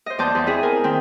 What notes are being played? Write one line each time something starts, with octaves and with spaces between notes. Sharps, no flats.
C5 D#5
E2 D5 A5 C6 G6
E2
C4 E4 G#4 D#5 B5
A#4 C5 G#5
D#3 C4